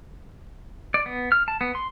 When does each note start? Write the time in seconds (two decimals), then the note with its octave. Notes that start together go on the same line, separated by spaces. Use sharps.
0.94 D5
1.06 B3
1.32 F6
1.48 A5
1.61 B3
1.75 C6